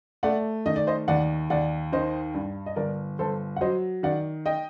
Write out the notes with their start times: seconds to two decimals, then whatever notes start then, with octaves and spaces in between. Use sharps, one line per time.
0.23 A3 D5 F#5
0.66 D#3 D#5
0.76 D5
0.87 C5 D#5
1.08 D#2 D5 F#5
1.50 D#2 D5 F#5
1.92 D#3 C5 D#5
2.34 G2
2.66 D#5
2.76 G1 A#4 D5
3.19 G1 A4 C5
3.56 F#5
3.61 F#3 C5 D#5
4.03 D#3 D5 F#5
4.46 D#5 G5